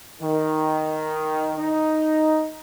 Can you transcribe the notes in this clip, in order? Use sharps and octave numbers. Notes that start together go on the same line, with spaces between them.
D#3
D#4